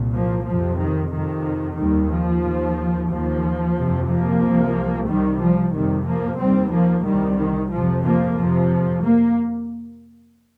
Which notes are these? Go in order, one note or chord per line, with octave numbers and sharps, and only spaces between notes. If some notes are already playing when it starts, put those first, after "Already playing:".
Already playing: C2 A#2
F3 A#3
F2 C3 F3
D#3
F2 C3 D#3
D#2 D#3 G3
F3
D#2
D#2 F3
F2 C3
F3 A#3
C2 C3
C2 C3 D#3 G3
F3
F2 C3 D#3 G3
F3 A#3
D#2 G3 C4
F3 A#3
C2 C3 D#3 G3
D#3
F2 C3 F3
F3 A#3
F2 C3 F3
A#3